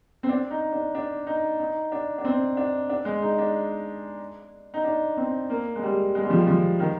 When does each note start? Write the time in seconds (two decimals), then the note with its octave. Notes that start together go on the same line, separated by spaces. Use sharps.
0.23 C4
0.29 D4
0.51 D#4
0.72 D4
0.95 D4
1.27 D#4
1.60 D#4
1.92 D4
2.18 D4
2.25 C4
2.57 D4
2.90 D4
3.05 G#3
3.22 D#4
3.38 D4
4.74 D#4
4.84 D4
5.17 C4
5.50 A#3
5.76 G#3
5.83 G3
6.15 G#3
6.23 G3
6.30 F3
6.38 G3
6.47 F3
6.79 D#3